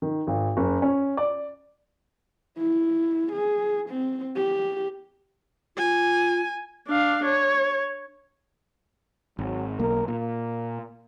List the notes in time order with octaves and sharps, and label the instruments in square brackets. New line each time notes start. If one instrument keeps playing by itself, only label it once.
[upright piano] D#3
G#1
F#1
C#4
D5
[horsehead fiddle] E4
G#4
C4
G4
[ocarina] F4 [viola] G#5
[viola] D4 F5
C#5
[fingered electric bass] G#1 [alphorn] F#3
[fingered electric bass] B1 A#3 [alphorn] A#4
[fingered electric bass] A#2 [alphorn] A#3